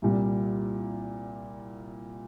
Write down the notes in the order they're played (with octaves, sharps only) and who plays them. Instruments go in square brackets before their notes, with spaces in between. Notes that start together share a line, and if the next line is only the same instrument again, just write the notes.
[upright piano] C2 A#2 G3